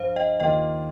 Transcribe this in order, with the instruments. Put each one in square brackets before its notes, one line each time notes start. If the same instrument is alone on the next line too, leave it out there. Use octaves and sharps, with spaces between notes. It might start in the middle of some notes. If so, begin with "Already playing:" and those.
Already playing: [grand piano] G2 F3 [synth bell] C5 F5
[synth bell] D#5 G5
[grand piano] D#2 D#3 A#3 F4 [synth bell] D#5 G5